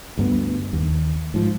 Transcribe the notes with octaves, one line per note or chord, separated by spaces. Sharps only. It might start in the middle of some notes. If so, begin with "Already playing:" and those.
D2 G2 B3
D#2
G#2 F3